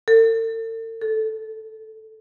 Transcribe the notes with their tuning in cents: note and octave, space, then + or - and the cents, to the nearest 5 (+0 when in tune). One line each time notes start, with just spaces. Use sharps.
A4 +45
A4 -5